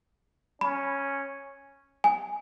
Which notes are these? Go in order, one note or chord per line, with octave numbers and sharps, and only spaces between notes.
C#4 B5
G#5